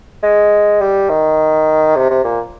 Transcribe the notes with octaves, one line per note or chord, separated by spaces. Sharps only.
G#3
G3
D#3
C3
C3
A#2